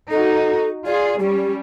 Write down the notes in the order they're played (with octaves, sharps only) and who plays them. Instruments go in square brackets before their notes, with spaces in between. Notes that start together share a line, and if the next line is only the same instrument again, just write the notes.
[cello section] D#4 F#4 [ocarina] A4
[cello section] F4 G#4 [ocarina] D5
[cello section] G3 C#4 [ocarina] G4